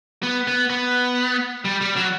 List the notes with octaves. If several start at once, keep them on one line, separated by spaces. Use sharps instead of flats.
B3
B3
B3
G3
G3
F#3